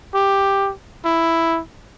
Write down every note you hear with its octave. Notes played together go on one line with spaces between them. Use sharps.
G4
E4